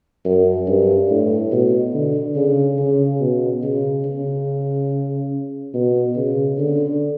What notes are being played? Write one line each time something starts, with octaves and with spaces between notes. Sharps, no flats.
F#2
G2
A2
B2
D3
C#3
C#3
B2
C#3
C#3
B2
C#3
D3